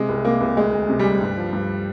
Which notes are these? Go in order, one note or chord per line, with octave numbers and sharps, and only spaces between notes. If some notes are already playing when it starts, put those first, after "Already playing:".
Already playing: C3 G#3
C2
C3 A#3
C2
D2 G#3
D2
C3
D2 G3
G2
F3
G2